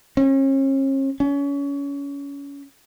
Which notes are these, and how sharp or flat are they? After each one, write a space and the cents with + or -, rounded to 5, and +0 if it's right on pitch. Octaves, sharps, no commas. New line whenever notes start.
C#4 -40
C#4 +25